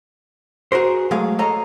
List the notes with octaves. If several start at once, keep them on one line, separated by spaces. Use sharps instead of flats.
F#4 G#4 A#4 C5
F#3 G#3 A3 G#4 F5
A4 C#5 D#5 F5 A#5